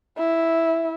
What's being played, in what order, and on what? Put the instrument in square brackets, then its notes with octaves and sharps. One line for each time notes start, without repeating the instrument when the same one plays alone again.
[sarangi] E4